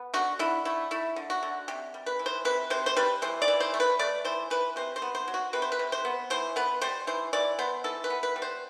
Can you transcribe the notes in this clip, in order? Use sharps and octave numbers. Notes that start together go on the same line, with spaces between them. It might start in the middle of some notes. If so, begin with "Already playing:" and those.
Already playing: B3
D3 F#4
D3 E4
A3 E4
A3 E4
D3
F#4
D3
C3 G4
G3
B4
E3
C5
C3 B4
C3 C5
C5
G3 B4
E3 C5
D5
E3
C5
A3
B4
A3 D5
E3 C5
E3 B4
C3 C5
C5
B3
C5
F#3
F#4
C3 B4
C5
B4
C3
C5
B3
E3 C5
B3 B4
G3 C5
E3 C5
E3 D5
B3 C5
E3 A4
B4
B3
B4
G3
C5